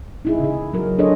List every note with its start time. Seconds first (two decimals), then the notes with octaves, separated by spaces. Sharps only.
0.25 D#4 E4 G#4
0.39 C#3 G#4
0.74 F#3 F#4 A#4
0.99 D4 G#4 A4 C5 C#5 D#5